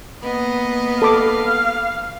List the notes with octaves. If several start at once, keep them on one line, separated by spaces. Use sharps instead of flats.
A#3 B3 D#5
A4 F5 B5 D6